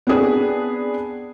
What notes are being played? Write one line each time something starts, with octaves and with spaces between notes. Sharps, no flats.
B3 C4 D4 G#4 B4